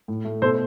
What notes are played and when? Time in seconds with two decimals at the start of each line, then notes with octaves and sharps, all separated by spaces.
0.08 A2
0.25 A3
0.42 B2 A4 C5